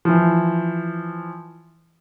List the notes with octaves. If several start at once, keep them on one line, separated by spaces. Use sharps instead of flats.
E3 F3